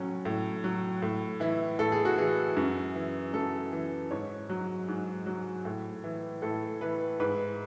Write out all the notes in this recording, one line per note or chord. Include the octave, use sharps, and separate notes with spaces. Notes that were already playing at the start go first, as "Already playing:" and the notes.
Already playing: A2 F#3 C#4
A2
F#3
A2
E3 E4
A2 A4
G#4
F#4
E3 G#4
F#2
E3
F#2 A4
E3
G#2 C#5
F#3
G#2
F#3
A2
E3
A2 A4
E3 B4
G#2 B4